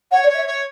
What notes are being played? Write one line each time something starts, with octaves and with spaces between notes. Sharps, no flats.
C#5 F#5
D5
C#5
E5
C#5